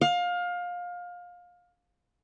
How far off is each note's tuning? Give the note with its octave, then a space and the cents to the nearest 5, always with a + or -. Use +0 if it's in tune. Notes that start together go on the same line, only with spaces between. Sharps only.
F5 +25